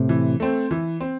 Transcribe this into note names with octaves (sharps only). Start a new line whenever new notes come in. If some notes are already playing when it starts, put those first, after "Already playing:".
Already playing: A2 C3
E3
A3 C4
E3
C4